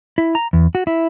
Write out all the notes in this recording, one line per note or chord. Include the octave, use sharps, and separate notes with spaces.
E4
A#5
E2
F#4
E4